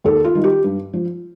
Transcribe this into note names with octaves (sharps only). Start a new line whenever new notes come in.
D#2 A4
F4
D#3 G3
G4
G2
F3